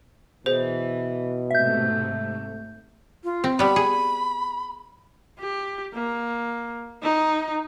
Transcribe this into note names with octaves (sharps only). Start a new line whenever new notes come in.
B2 E3 G#4 C5
G#2 C3 A3 E5 G6
F4
C4
G3 B3 B5
G#4
G4
A#3
D#4